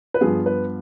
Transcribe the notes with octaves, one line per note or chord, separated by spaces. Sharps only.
B4
G2 F3 B3 G#4
B4